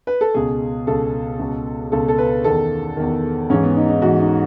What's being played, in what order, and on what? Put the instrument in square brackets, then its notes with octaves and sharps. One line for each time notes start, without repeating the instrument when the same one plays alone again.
[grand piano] B4
A4
C#2 B2 G#4
C#2 B2 A4
C#2 B2
C#2 B2 A4
A4
B4
E2 D#3 A4
E2 D#3
G#2 E3 C#4
B3
D#4
D#4
G#2 E3 F#4
D#4